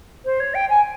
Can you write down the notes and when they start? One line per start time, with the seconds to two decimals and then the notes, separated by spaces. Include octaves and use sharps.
0.25 C5
0.39 C#5
0.54 G5
0.69 G#5